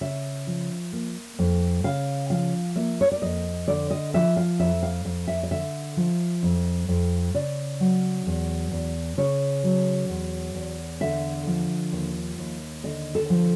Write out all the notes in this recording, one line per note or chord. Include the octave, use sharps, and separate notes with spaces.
C#3 E5
F3
A#3
F2
C#3 F5
F3 F5
A#3 E5
C#5
D5
F2 D#5
D3 D5
D#5
F3 E5
F5
F2 E5
F5
F2 F5
E5
D#5
D3 E5
F3
F2
F2
C#3 D5
F#3
E2
E2
C#3 C#5
F#3
E2
E2
D3 E5
F3
D#2
D#2
D3 D#5
A4
F3